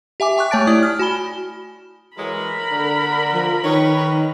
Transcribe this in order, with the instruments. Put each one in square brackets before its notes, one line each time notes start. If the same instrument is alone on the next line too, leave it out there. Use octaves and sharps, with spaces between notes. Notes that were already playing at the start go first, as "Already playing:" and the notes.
[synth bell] G4 E5 G#5 D6
G5 C#6 D6 F#6
A3 C#5 G#5 A5 A6 D7
E4 D5 D#6
F6
F#4 G#5 B5 G7
[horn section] E3 F#3 G#3 [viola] A#4 B5
[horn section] D3
[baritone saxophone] F3
[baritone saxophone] D#3 [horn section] D#4 B4 C#5